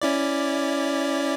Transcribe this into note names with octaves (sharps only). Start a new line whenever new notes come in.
C#4 E4 D5